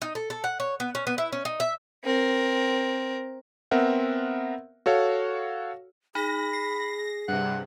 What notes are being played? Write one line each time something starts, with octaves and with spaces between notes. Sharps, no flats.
D#4
A4
A4
F#5
C#5
B3
C#4
B3
E4
C#4
D#4
E5
C4 A#4
B3 C4 A#4 E5 F#5
F#4 A4 C#5 F5
D#4 G#4 B5 A#6
C7
G2 C3 F#5